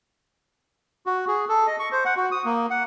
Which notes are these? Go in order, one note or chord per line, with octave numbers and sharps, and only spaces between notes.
F#4
G#4
A4
D#5
C#6
C5
F#5
F#4
D#6
A#3
F#5